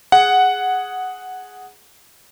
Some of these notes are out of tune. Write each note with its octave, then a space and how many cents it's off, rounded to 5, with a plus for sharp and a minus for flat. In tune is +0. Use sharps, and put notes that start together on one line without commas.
G#4 +0 F#5 +0